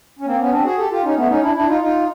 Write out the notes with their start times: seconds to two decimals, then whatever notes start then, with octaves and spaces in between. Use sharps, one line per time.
0.19 C#4
0.26 A#3 C4
0.39 B3 C#4
0.51 C4 D4
0.64 F#4 G#4
0.77 G4 A4
0.90 F4 G4
1.03 C#4 D#4
1.16 A3 B3
1.29 C#4 D#4
1.42 D4 E4
1.55 D4 E4
1.67 D#4 F4
1.81 D#4 F4